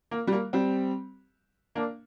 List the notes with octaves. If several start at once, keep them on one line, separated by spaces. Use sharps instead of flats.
A#3
G3
A#3
G3 C4
A#3 D4